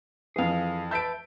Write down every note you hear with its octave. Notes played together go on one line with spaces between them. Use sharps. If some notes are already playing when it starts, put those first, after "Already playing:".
F2 E3 G#4 F5
B4 E5 A5 G6 D7